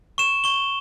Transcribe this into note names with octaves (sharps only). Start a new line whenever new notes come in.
C#6 E7
C#6 G7